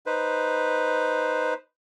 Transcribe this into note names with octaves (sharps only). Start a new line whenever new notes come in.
D#4 B4 C5